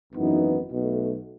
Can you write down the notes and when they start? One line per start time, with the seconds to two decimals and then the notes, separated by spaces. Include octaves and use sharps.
0.13 G#1 F#2 E3 B3 D#4
0.71 B1 B2 A3